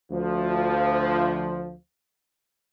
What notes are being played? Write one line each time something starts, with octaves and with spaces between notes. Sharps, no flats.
D2 F3